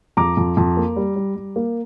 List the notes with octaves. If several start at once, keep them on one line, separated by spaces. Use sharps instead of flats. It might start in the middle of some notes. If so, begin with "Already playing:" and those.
F2 A#5 D6
F2
F2
A#3
G3
G3
G3
A#3